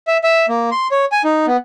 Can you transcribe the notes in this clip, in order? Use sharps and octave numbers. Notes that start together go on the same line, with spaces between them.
E5
E5
A#3
C6
C#5
G#5
D#4
B3